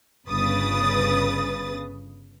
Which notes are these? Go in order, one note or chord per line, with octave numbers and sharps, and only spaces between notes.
G1 C#3 B4 D#6 A6